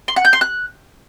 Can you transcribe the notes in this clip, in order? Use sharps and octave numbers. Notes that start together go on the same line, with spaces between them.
C6
F#5
G6
C6
F#6